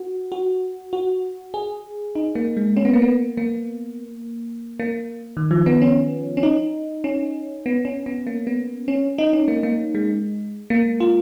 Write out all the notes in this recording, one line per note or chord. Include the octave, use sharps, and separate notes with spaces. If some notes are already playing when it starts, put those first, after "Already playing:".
Already playing: F#4
F#4
F#4
G#4
D#4
A#3
G#3
C#4
B3
A#3
B3
A#3
A#3
D#3
F3
B3
C#4
C#4
D#4
C#4
B3
C#4
B3
A#3
B3
C#4
D#4
C#4
A#3
A#3
G#3
A#3
F4